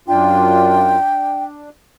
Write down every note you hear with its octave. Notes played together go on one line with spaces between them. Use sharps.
F#2 D4 F4 G5
D4